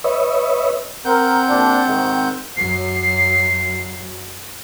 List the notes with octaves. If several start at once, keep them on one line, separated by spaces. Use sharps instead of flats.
B4 C#5 D#5 E5
C4 A#4 F#5 G6
A#1 D4
G#2 C3 D#3
F#2 F#3 C7